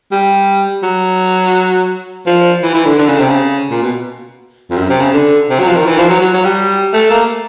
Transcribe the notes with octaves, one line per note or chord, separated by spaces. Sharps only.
G3
F#3
F3
E3
E3
D3
D3
C#3
C3
C#3
A#2
B2
F2
F#2
C3
C#3
D3
C3
F#3
F3
D#3
E3
F3
F#3
F#3
F#3
G3
A3
A#3